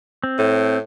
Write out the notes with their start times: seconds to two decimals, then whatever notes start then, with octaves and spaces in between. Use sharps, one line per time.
0.24 C4
0.38 A2